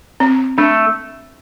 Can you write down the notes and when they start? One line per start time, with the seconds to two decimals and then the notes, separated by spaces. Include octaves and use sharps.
0.20 C4
0.58 A3 D4